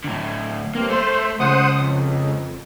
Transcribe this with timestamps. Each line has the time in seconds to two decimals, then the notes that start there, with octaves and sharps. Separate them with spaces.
0.04 A2 D3
0.75 G2 A#3 C4
0.90 A3 C5
1.40 C#2 C#3 C5 F#5 D#6
1.76 F2